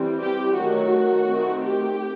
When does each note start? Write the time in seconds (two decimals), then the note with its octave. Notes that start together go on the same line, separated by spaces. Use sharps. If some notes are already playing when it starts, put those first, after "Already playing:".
Already playing: E3 G3 C4
0.20 G4
0.56 D#3 F#3 A3 F#4
1.28 D#3 A3 C4
1.63 G4